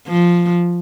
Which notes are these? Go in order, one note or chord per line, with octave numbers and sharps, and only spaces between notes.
F3